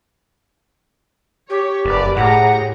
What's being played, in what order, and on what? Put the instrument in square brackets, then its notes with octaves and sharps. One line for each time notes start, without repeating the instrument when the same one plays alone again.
[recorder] G4 [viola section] C#5
[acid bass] F#1 [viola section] A#4 B4 D5
[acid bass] A2 [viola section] G4 G#4 A#5 [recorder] F#5